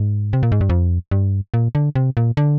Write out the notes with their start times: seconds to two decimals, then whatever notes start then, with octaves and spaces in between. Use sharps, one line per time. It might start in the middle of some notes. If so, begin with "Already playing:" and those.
Already playing: G#2
0.33 C3
0.43 A#2
0.52 G#2
0.61 G2
0.70 F2
1.11 G2
1.54 A#2
1.75 D3
1.95 C3
2.17 A#2
2.37 D3